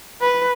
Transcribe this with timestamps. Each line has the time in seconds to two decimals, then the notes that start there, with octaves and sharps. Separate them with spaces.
0.21 B4